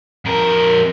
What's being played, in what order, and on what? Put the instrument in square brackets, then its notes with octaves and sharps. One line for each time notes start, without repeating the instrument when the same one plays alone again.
[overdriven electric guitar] F2 A#4